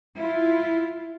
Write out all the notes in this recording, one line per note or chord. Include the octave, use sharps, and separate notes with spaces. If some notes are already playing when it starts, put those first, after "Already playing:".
E4 F4